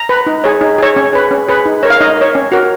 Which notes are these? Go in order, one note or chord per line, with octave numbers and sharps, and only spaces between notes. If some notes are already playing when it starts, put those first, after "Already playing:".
Already playing: A#5
B4
D#4
G#4 C#5
D#4
G#4 C#5
C#4
G#4 B4
C#4
G#4 B4
D#4
A#4 C#5
F5
D#4 D#5
A#4 C#5
C#4
F#4 A#4